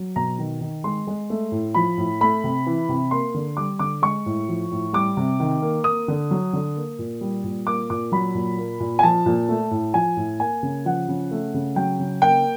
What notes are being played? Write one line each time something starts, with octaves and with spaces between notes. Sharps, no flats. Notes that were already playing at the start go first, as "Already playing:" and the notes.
Already playing: F#3
B2 A#5
D#3
D#3
G#3 C6
G#3
A3
A2
F3 B5
A2
A3 B5
C3
E3
C3
A#3 C6
D3
G3 D6
D3 D6
G#3 C#6
A2
F3
A2
G3 D6
C3
D#3
A#3
A#3 D#6
D3
F#3
D3
A#3
A#2
G3
A#2
A#3 D6
A#2 D6
F#3 B5
A#2
A#3
A#2
G#5
F3 A5
A#2
A3
A2
F3 G#5
A2
A#3 G#5
C#3
F3 F#5
C#3
A3
C#3
F#3 G5
C#3
A#3 G5